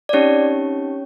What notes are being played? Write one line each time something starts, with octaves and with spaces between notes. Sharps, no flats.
D5
C4 C#4 D#4 G4 C#5